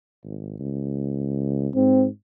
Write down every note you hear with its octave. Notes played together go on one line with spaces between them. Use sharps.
G#1
C#2
G#2 C4